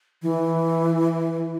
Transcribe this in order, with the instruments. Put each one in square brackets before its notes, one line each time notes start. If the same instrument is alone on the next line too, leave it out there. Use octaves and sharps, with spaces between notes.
[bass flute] E3